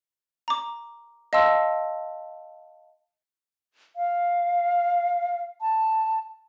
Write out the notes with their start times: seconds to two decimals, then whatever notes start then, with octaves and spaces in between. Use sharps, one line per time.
0.48 A#5 D6
1.33 D#5 F5 A5 C6 E6
3.96 F5
5.61 A5